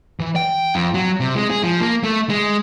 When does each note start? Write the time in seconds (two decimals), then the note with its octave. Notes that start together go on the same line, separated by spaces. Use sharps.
0.20 E3
0.36 G5
0.75 F2
0.94 F#3
1.21 C3
1.35 G#3
1.50 G#4
1.63 F3
1.80 A#3
2.03 A3
2.29 G#3